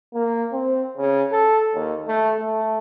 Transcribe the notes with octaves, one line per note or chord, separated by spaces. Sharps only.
A#3
C4
C#3
A4
D#2
A3
A3